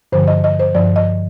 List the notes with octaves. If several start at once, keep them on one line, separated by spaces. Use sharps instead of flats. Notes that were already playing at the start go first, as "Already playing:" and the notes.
G2 D3 F3 C5
D#5
D#5
C5
G2 F3 D5
D#5